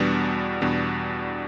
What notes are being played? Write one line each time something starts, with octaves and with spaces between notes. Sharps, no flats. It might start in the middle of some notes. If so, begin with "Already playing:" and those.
Already playing: E2 B2 G3 B3 D4
E2 B2 G3 B3 D4